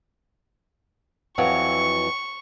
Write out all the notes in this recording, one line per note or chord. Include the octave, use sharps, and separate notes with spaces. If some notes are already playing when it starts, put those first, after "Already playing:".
F2 E3 F#3 C#6